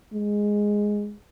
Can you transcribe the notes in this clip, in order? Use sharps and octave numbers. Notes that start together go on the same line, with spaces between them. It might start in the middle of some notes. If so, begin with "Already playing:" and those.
G#3